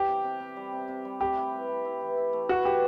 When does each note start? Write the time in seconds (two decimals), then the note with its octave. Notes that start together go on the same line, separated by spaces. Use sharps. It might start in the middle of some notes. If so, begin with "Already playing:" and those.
Already playing: E3 G3 G4
0.09 C3
0.24 C3
0.40 C3
0.57 G3
0.73 C3
0.88 C3
1.05 G3
1.21 A3 G4
1.37 E4
1.53 B4
1.68 A3
1.85 E4
2.01 E3
2.17 E4
2.33 A3
2.49 F#4 B4
2.65 E3 G4